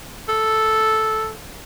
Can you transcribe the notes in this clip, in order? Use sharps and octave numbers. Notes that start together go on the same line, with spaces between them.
A4